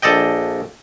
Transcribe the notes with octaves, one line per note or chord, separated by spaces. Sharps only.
A#1 A4 D5 D#5 G5